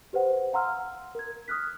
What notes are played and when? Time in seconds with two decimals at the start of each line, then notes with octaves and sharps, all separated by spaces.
0.13 G4 B4 C5 F#5
0.53 F5 F#5 A#5 C6 E6 F6
1.15 A#4 G#6
1.48 D#6 F6 F#6 B6